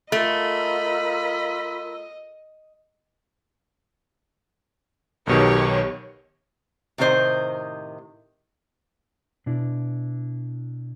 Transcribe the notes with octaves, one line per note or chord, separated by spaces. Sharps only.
A3 F4 A#4 D#5 B5 E6
B1 B2 D#3 G4 C#5
A2 C3 D#3 C4 C5 D#5
B2 D4 E4